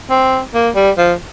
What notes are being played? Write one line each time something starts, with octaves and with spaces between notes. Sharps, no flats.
C4
A#3
G3
F3